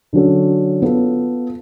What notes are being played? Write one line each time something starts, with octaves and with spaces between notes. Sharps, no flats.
D3 F#3 C#4 F#4 A4
B3 F4 A4